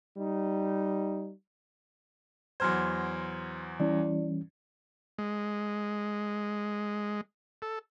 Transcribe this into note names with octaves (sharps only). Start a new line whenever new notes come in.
G3 D#4
E2 F#3 C5 C6 F6 G#6
E3 G3 C#4 E4 D5
G#3
A4